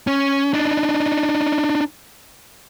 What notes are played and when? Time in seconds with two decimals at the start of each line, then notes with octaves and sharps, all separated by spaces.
0.07 C#4
0.54 D4 D#4